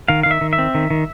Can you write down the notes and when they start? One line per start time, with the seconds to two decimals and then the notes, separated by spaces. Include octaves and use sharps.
0.08 D#3 F5
0.23 F5
0.26 D#3 E5
0.41 D#3
0.53 E5
0.58 C4
0.75 D#3
0.90 D#3